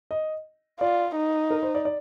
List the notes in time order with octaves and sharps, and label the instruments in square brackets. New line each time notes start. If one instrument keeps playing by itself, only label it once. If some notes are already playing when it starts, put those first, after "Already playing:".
[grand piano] D#5
[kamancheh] F4 [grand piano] D5
[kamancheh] D#4
[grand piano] A#4
C5
D5
D5